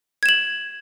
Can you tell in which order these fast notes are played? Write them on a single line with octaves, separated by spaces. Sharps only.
G#6 E7 F#7